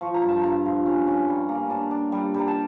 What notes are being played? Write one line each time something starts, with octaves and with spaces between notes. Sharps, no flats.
F3 C#6
A#5
G2
A5
G2 A#5
F3
C#4
C#4
G3
A#3
D4 A5
D4
G3
G3 A#5
A5